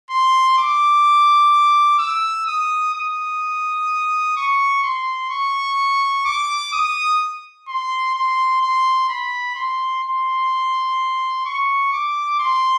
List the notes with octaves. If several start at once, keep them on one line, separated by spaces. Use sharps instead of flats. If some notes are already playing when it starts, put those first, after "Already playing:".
C6
D6
E6
D#6
D#6
C#6
C6
C#6
D6
D#6
C6
C6
C6
B5
C6
C6
C#6
D6
C6